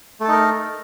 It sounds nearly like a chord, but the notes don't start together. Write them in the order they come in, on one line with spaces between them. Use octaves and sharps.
A3 A4 D#4 A#4